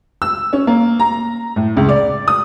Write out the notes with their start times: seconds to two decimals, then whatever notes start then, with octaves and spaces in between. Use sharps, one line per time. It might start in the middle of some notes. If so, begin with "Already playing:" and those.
0.22 E6
0.53 C#4
0.67 A#3
0.99 A#5
1.56 A2
1.77 C#2
1.89 D5
2.28 D#6